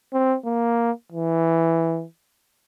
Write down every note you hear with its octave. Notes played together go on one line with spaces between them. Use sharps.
C4
A#3
E3